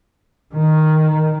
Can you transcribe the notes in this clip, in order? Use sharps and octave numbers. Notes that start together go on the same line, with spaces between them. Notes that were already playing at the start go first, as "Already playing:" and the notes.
D#3